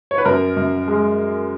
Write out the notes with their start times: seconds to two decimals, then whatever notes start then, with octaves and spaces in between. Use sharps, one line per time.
0.11 C#5
0.18 B4
0.25 F#2 A#4
0.57 F#2
0.88 G#3